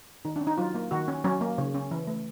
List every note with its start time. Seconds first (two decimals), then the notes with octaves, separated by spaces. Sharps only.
0.25 D#3 D#4
0.36 D4
0.41 C#4
0.47 D#4
0.58 F#3 F4
0.75 A#3
0.91 D#3 F#4
1.08 C#4
1.24 F#3 C#4
1.41 A#3
1.58 C#3
1.74 C#4
1.91 E3
2.07 A3